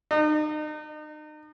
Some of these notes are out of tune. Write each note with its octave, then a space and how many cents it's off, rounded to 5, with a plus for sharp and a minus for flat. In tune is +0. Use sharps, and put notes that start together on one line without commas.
D#4 -35